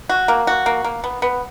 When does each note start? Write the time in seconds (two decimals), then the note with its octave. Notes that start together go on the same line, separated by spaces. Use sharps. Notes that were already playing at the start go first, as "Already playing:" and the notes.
0.09 F#4
0.28 A#3
0.47 F#4
0.66 A#3
0.84 A#3
1.04 B3
1.22 B3